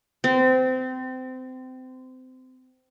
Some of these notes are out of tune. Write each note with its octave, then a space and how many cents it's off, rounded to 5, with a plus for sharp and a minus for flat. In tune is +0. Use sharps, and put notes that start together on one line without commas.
C4 -25